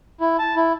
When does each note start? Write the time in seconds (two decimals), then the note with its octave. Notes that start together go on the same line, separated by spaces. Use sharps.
0.20 E4
0.39 A5
0.56 E4